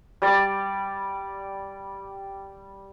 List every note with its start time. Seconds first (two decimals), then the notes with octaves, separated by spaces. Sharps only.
0.22 G3 D5